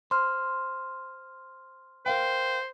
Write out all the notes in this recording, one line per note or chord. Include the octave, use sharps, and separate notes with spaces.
C5 C6 F6
A#4 C5 F5 G5